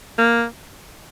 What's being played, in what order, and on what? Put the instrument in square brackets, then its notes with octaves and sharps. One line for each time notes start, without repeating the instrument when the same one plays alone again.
[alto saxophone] A#3